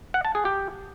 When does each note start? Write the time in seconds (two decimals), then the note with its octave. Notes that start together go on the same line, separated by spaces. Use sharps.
0.14 F#5
0.25 A5
0.35 G#4
0.45 G4